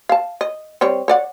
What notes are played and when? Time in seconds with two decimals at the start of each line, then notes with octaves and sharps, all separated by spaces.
0.09 F5 A5
0.41 D#5
0.81 G3 C4 C#5
1.08 C#5 D5 F#5